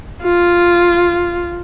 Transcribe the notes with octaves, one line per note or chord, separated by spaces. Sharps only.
F4